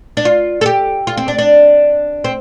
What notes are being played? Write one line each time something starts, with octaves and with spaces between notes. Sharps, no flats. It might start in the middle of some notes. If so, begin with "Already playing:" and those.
D4
F4
A4
G4
F4
C4
D4
D4
C4